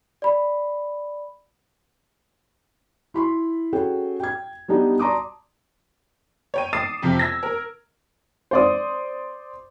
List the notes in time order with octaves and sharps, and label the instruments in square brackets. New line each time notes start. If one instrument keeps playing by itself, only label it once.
[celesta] D5 B5
[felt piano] E4 B5 C6
C#4 F#4 G#4 A4 G5
G5 G#6
G3 B3 D4 D#4 G4
D5 A5 A#5 C6 D6 D#6
[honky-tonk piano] C#5 G5 D#7
D6 D#6 A6 C7 E7
F2 C3 F3
E6 G#6 A#6
A#4
[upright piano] C5 D5 D#6